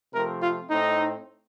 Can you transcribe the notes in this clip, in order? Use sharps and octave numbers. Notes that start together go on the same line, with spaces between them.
C3 F3 A3 C4 A#4
F4
A2 A3 C4 D#4